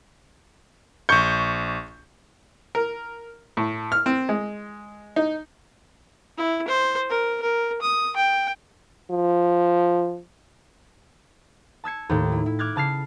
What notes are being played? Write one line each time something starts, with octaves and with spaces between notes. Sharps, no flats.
A#1 C#6 G6 C#7
A#4
A2
F6
C4
G#3
D#4
E4
C5
A#4
A#4
D#6
G5
F3
A5 E6 G#6 C#7
D#2 A2
E4
E4
D6 F6 F#6 G#6 A6
C#3 A5 F6 C7